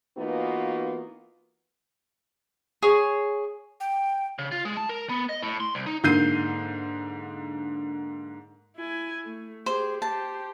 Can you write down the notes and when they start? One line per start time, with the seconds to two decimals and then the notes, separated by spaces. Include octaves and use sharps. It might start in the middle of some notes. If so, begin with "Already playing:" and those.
0.17 E3 A#3 B3 D#4 F4 F#4
2.83 G#4 C#5
3.80 G5
4.39 C#3
4.52 F4
4.65 G#3
4.77 A5
4.89 A#4
5.09 B3
5.29 D#5
5.43 A2
5.60 C6
5.75 C2
5.86 D#4
6.03 G#2 D3 A#3 G6 C7 D#7
8.76 E4 G#5
9.25 A3
9.66 G4 G#4 C5
10.02 G4 C5 A5